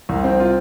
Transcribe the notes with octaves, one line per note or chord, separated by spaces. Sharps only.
C2
C4
F4